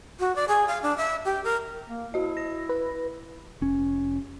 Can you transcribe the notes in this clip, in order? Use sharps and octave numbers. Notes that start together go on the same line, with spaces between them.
F#4
D5
G#4
F5
D4
E5
G4
A#4
A#3
E4 F#4 D#5
A#6
B4
F1 C#4